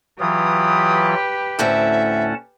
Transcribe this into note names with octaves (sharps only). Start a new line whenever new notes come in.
E3 F#3 F4 G4 B4 D#6
D2 A2 C4 C#4 E5 F#5 A5